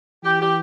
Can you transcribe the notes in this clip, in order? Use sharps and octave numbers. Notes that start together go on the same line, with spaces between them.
E3 G4
G4